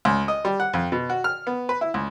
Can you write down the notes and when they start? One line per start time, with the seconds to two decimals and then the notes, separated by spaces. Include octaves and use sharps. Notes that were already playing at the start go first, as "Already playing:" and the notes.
0.05 C#2
0.28 D#5
0.45 G3
0.60 F#5
0.74 F2
0.92 B2
1.10 F#4
1.24 F6
1.47 B3
1.69 B4
1.81 E4
1.94 C#2